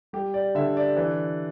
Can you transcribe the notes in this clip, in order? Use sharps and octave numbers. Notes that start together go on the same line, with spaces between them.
G3 G4
D5
D3 E5
D5
E3